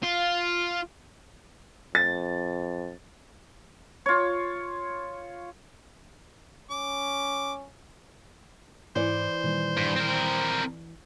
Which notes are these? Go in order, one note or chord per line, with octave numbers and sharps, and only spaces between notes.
F4
F2 A6
F4 C#5
C#4 D6
G#2 E3 C5 D5
A#2 D#3 G3
G2
C4 A#4